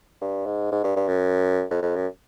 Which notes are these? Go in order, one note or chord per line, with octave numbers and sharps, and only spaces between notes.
G2
G#2
G#2
G2
G2
F#2
F2
F2
F#2